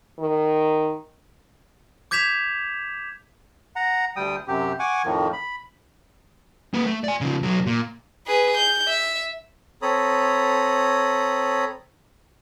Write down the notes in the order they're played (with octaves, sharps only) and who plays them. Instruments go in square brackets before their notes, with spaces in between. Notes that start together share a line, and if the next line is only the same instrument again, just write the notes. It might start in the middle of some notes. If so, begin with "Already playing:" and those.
[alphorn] D#3
[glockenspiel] D6 G6 G#6 B6 E7 F7
[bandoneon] F#5 A#5
D2 G3 G5 D#6
F#2 C3 G4
F#5 G#5 C#6 D6
F2 A2 D#3 F3
B5
[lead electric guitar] A#3 B4
A3
D5 G#5
C#3 F3
B1 F#3
A#2
[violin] G#4 B4
G6
E5
[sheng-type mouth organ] C4 A4 C#5 A#5 B5 D#6